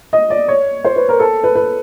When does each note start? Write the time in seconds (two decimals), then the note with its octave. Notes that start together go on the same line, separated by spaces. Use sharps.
0.13 D#5
0.30 D5
0.48 C#5
0.84 C5
0.96 B4
1.09 A#4
1.20 A4
1.44 B4
1.55 B4